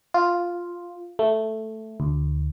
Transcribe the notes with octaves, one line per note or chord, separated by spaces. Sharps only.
F4
A3
D2